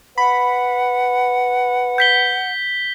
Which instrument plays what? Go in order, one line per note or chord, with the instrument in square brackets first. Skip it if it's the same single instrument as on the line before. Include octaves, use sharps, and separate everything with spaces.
[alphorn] B4 [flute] F#5 [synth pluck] B5
[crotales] G6 B6 G7